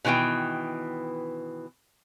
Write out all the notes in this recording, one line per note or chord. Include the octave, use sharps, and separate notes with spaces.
B2 D#3 E3 B3 G5